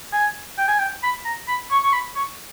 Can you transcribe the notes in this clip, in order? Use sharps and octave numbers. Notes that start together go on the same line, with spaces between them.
G#5
G5
G#5
G5
B5
A#5
B5
C#6
C#6
B5
C#6